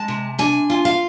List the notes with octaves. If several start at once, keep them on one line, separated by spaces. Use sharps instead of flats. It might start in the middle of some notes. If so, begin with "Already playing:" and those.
Already playing: G#3 A5
C3
D4 G#5
F4
F5